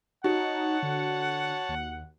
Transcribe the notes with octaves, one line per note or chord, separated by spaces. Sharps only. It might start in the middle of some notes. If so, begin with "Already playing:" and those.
D#4 F#4 C#5 F#5 A5
D3
D#2